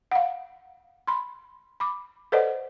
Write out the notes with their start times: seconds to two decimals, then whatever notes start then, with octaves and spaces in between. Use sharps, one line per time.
0.11 F5 F#5
1.07 B5 C6
1.80 B5 D6
2.32 A4 B4 C5 D5 D#5 F#5